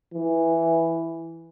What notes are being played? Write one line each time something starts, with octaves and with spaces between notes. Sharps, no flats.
E3